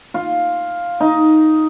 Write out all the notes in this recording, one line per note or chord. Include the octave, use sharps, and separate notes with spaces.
F4
D#4